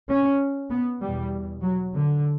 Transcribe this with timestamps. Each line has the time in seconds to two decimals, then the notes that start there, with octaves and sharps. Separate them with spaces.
0.09 C#4
0.70 B3
1.01 E2 B2 G3
1.62 F#3
1.93 D3